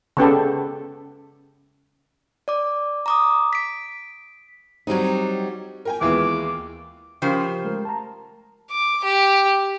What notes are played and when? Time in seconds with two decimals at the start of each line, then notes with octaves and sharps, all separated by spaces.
0.17 C#3 B3 G4 A4
2.48 D5 D6
3.06 A#5 D6 D#6
3.53 B6 D7
4.87 F#3 G3 C4 D#4
5.85 A#4 G5 G#5
6.01 D#2 E3 G#3 B3 E4 F4 D6
7.22 C#3 F3 G4 A#4 C5 G5
7.65 G#3 A3 A#4
7.85 A5 A#5
8.71 D6
9.04 G4